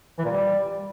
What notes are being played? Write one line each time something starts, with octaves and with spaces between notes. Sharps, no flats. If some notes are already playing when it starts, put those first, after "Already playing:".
E3
A#2
G3